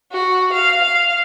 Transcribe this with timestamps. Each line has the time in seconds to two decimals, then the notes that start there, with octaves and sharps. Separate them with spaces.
0.12 F#4
0.53 F5
0.84 F5